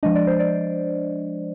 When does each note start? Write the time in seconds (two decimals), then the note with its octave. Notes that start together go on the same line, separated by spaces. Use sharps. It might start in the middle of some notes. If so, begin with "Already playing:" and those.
0.03 F3 G#3 D4 D#5
0.15 D5
0.27 C5
0.39 D5